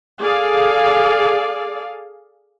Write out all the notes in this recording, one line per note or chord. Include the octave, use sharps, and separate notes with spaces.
G#4 A4 D5 F5